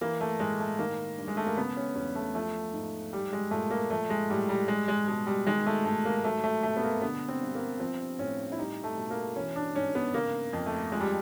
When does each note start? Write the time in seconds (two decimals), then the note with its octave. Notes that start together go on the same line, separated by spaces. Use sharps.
0.01 E3 A#3
0.21 A3
0.40 A2 G#3
0.60 A3
0.79 D#3 A#3
1.18 G2
1.28 G#3
1.37 A3
1.47 A#3
1.57 C#3 B3
1.77 C#4
1.96 E2 C#4
2.15 A3
2.35 F3 A3
2.74 G#2
3.13 G3
3.33 G#3
3.51 A#2 A3
3.71 A#3
3.91 F3 A3
4.10 G#3
4.30 A2 G3
4.49 G3
4.68 G3 G#3
4.88 G#3
5.08 B2 G#3
5.27 G3
5.46 D#3 G#3
5.67 A3
5.85 G#2 A3
6.05 A#3
6.24 F#3 A3
6.44 A3
6.63 B2 A3
6.77 B3
6.83 A#3
7.02 D3 B3
7.28 C4
7.41 G2
7.55 A#3
7.80 F3 C4
8.19 A2 C#4
8.52 E4
8.58 G3 D#4
8.84 A3
8.97 B2
9.10 A#3
9.36 E3 C#4
9.56 D4
9.75 G#2 C#4
9.95 B3
10.14 C#3 A#3
10.53 F2
10.66 A3
10.92 F3 G#3
11.00 G3